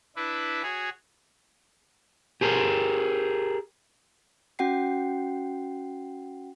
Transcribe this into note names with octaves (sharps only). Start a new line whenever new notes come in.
D4 E4 B4
F#4 G#4 C#5
G4 G#4 A#4
C#4 F#4 F#5 G5 C7